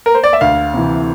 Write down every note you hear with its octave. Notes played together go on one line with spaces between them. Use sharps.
A#4
C5
D5
E5
D2 F5
C3 E3